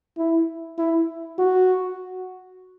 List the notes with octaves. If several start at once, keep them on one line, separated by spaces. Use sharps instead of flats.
E4
E4
F#4